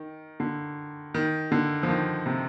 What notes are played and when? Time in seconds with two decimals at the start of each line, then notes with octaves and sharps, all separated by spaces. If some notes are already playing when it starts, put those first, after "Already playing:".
Already playing: D#3
0.40 D3
1.14 D#3
1.52 D3
1.83 F3
1.89 D#3
2.26 C3